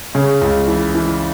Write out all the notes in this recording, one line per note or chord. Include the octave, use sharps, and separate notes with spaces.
C#3
C#2
E3
E3